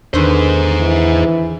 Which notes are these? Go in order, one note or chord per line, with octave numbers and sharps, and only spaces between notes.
E2 D3 D#3 G#4 B4 C5
E3